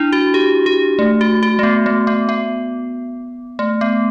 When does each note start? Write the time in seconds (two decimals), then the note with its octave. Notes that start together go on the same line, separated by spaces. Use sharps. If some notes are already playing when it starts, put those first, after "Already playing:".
Already playing: D4 E4
0.12 F#4
0.34 G4
0.66 G4
0.99 A3
1.21 F#4
1.43 F#4
1.59 A3
1.63 B3
1.86 A3
2.07 B3
2.29 B3
3.59 A3
3.81 B3